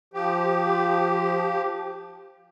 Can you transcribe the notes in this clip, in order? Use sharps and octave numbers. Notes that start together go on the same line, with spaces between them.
F3 G4